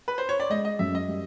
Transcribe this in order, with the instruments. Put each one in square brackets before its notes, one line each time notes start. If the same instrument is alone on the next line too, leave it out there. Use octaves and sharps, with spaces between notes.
[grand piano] B4
C5
C#5
D5
[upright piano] G#3 [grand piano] D#5
[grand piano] D#5
[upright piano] F#2 [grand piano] E5
[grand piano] D#5
[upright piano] G3